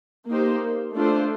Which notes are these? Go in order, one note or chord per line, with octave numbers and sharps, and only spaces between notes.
A#3 D#4 G4 C5
A3 D4 F4 A4 C5